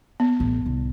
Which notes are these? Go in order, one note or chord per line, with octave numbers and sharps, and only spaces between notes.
B3
A1
C2